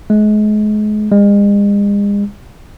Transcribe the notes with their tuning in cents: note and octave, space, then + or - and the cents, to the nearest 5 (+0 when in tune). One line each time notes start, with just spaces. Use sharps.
G#3 +35
G#3 -40